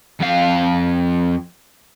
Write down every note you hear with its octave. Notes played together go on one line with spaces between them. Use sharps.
F2 F5